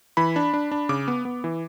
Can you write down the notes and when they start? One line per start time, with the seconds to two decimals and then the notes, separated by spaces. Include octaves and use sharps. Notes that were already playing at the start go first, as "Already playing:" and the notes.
0.17 E3 B5
0.36 D4
0.54 D4
0.71 D4
0.89 C#3 D6
1.08 B3
1.25 B3
1.44 E3